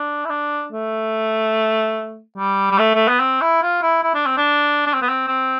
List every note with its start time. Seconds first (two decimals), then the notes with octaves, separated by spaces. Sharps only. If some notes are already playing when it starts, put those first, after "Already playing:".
Already playing: D4
0.25 E4
0.30 D4
0.72 A3
2.38 G3
2.71 G3
2.79 A3
2.95 A3
3.08 B3
3.20 C4
3.41 E4
3.62 F4
3.82 E4
4.03 E4
4.14 D4
4.26 C4
4.37 D4
4.86 D4
4.94 C4
5.02 B3
5.09 C4
5.27 C4